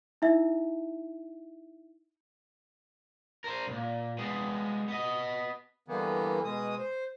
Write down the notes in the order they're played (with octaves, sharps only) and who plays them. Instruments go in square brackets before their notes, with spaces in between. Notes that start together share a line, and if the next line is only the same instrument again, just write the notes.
[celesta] D#4 E4 E5
[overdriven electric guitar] A#4 C5
C2 A#2
G#3 B3
B3 D#5
[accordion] G2 D3 E3 A#3 B3
B2 G#3 D#6
C5